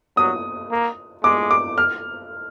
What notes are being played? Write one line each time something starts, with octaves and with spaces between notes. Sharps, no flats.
F#3 D#6
A#3
G#3 D6
D6
F6